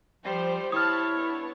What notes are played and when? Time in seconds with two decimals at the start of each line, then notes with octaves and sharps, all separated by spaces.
0.25 F3 G3 C5
0.72 E4 C5 C#5 A5 B5 D#6 F6
1.15 B3 D4 A5